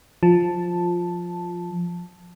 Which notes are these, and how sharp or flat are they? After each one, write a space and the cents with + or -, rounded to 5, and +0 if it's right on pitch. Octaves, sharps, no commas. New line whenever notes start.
F3 +5 A5 +0